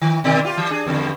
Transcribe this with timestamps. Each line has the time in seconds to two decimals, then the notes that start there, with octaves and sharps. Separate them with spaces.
0.02 D#3
0.24 B2 D#3 D5
0.44 F4 G4
0.57 E3
0.71 D4 G#4
0.86 E2 G2 D3